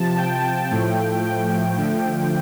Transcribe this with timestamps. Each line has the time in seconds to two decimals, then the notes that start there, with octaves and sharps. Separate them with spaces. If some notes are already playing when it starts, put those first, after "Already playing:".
Already playing: C3 F3 A5
0.18 G5
0.70 A2 F3 A3
1.25 G5
1.77 D3 F3 A3